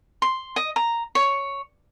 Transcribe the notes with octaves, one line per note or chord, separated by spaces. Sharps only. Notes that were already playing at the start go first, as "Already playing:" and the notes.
C6
D#5
A#5
C#5